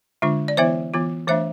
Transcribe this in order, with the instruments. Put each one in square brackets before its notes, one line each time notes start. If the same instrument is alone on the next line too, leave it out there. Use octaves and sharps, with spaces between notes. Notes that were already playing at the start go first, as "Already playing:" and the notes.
[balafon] D3 G#3 D4 F4
D5
E3 B3 E4 C5 E5
E3 B3 F4
E3 A3 D4 C5 E5